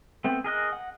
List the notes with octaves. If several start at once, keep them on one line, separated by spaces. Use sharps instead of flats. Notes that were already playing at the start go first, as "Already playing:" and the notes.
A3 B3 C4
G#4 A#4 D#5 F#6
F#5